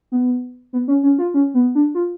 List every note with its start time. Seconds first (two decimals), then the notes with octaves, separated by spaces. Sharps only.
0.12 B3
0.73 B3
0.88 C#4
1.03 C#4
1.19 F4
1.34 C#4
1.54 B3
1.75 D4
1.95 F4